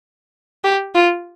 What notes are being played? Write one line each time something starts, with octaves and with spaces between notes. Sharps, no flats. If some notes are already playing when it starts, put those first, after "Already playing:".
G4
F4